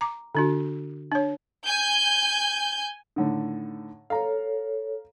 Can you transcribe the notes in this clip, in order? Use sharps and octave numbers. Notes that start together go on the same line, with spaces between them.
A#5 D6
D3 D4 F#4
D4 C#5
G#5 G6
A2 D3 D#3
A4 C#5 F5 A#5